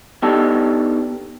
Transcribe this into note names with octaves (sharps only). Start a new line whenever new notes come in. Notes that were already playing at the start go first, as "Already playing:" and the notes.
B3 D4 D#4 G4 A4